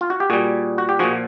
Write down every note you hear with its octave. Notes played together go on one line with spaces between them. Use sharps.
F4
F#4
G4
A#2 G3 F#4 G#4
F#4
G4
A#2 F3 F#4 G#4